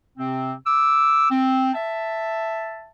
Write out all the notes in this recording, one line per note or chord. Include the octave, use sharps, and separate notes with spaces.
C3 C4
D6 E6
C4
E5 A5